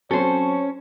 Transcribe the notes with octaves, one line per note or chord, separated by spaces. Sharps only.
F#3 C4 C#4 A4 C5 C#5